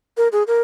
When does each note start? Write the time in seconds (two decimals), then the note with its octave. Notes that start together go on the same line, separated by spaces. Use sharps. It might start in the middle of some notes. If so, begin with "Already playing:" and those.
0.17 A#4
0.32 G#4
0.47 A#4